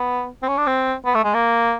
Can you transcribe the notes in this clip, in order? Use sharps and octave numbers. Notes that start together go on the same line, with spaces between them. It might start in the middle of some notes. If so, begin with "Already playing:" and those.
Already playing: B3
C4
C#4
D4
C4
B3
A3
G#3
A#3